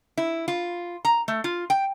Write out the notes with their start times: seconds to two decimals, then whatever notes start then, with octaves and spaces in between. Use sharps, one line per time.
0.17 E4
0.48 F4
1.05 A#5
1.28 A3
1.44 F4
1.70 G5